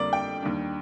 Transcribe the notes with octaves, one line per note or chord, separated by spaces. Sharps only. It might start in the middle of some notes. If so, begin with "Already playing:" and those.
Already playing: F2 D3 G3 A#3 D5
G5
D#2 D#3 G3 D4